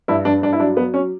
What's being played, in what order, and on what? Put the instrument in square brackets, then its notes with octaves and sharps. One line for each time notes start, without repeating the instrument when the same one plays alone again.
[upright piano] G2 E4
G2 D4
G2 D4
E4
F#3 D4
F#3 B3
F#3 C#4